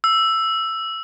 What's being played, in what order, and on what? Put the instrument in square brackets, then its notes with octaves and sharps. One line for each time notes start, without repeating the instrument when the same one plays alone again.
[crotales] E6